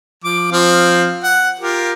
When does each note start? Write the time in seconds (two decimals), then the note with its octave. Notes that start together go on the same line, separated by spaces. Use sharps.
0.24 F3 D6
0.52 F3 C4 F5
1.23 F#5
1.59 F4 G4 A#4